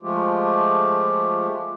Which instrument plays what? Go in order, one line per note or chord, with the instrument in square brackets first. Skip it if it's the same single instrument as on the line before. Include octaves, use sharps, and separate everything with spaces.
[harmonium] F3 G#3 A3 F4 G4